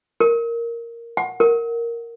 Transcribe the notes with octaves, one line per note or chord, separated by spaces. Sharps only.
A#4
F#5
A#4